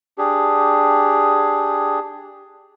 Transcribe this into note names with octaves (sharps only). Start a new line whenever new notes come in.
D4 G4 G#4